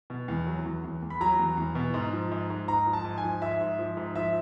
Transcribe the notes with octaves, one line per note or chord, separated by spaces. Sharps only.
B2
E2
F#3
E2
E2
E2
B5
F#3 A#5
E2
E2
B2
G#2
F3
G#2
G#2
G#2 A#5
F3
A5
G#2
G#5
F3
G#2 E5
G#2
F3
G#2
F3 E5